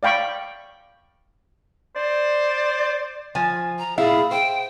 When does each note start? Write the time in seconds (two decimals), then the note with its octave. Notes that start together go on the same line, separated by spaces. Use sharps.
0.03 D5 F5 G5 B5 C#6
1.96 C5 D5
3.35 F3 G#5
3.79 A#5
3.98 A#2 E4 G#4 F5
4.31 C5 G5